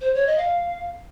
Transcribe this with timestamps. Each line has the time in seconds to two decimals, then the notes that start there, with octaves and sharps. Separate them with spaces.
0.01 C5
0.14 C#5
0.27 D#5
0.38 F5